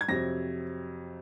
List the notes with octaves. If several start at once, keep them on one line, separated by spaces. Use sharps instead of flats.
G#6
F2 C3 F#3 A#6